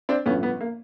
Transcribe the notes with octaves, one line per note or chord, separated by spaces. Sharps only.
C4 D4
A1 G2 D3 F3 B3 C#4
B3
A#3